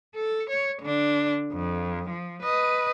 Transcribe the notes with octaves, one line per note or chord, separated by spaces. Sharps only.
A4
C#5
D3 D4
F2
F3
B4 D#5